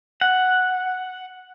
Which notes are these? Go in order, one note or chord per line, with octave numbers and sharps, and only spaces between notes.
F#5